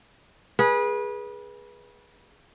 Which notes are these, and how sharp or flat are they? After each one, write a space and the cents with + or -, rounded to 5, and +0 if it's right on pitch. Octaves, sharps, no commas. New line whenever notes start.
G#4 +0 B4 -25